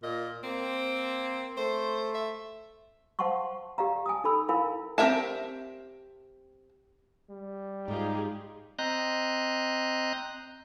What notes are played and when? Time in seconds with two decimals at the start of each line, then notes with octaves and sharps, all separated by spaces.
0.03 A#2 D#5
0.43 A#3 C4
1.57 A3 C5
2.15 E5
3.19 C5 F5 F#5 A5 C6 C#6
3.78 G4 D5 F5 A#5
4.06 G#5 A5 D#6
4.24 D#4 A4 B5 E6
4.48 E4 A#4 F5 G#5 B5
4.98 C4 G4 A#4 E5 A5
7.30 G3
7.88 G#2 D#4 F4 G4 G#4
8.79 C4 D#5 A#5 F#6 G6